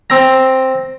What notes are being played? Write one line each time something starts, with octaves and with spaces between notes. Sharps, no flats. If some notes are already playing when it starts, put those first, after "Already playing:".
C4 A#5